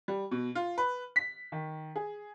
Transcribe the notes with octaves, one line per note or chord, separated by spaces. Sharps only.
G3
B2
F4
B4
B6
D#3
G#4